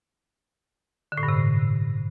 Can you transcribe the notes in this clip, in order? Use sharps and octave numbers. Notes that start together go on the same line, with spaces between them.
D3
A2
G2
C3